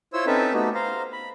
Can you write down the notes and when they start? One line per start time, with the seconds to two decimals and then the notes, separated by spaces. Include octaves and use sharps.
0.13 E4 F4 C5 C#5 E6
0.27 C4 C#4 D#4 A4 B4 E5
0.53 A3 B3 D#4 F#4 G4
0.75 C5 F5 A#5
1.12 B5